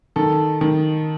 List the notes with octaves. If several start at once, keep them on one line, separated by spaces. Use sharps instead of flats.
D#3 A4
D#3